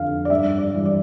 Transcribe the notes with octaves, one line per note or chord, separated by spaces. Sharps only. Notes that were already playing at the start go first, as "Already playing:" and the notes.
Already playing: F2 D3 F3 F5
D5
G2 E5
D5
E3 G3
D5